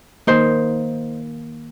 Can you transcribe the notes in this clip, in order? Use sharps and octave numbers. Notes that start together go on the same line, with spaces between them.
D#3 A#3 D#4 C5